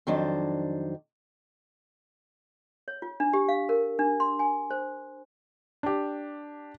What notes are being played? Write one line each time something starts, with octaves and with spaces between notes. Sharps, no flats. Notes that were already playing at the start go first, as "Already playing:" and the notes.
F2 D#3 F#3 D4 C5
C#5
F4
D4
G4
F5
A#4
D4
C6
G#5
C5
D4 G4